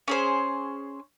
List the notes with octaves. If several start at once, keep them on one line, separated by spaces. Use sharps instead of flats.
C#4 G#4 C5